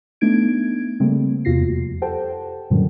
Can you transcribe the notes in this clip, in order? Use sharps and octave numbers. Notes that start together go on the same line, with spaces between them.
A3 B3 D4 D#4 G#6 D7
C#3 G3 A3 A#3 C4
E2 C3 F4 F#4 A#6 C7
F2
G4 A4 C5 F#5 G5 A5
F#2 A#2 D3 D#3 F#3 G3